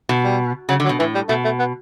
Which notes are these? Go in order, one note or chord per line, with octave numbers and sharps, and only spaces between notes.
B2
G3
C#3 F#3
D3
F#3
B2
A2 E3
G3
B2 A3
A3
B3